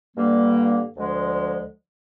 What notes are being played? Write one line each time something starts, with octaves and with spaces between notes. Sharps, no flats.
G2 D3 G3 A#3
D2 D3 F3 G#3